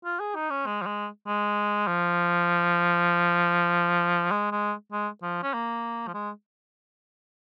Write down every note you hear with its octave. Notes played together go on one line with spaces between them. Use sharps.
F4
G#4
D#4
C#4
G#3
F3
G#3
G#3
F3
G#3
G#3
G#3
F3
C#4
A#3
F3
G#3